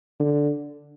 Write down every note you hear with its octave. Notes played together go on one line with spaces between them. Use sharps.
D3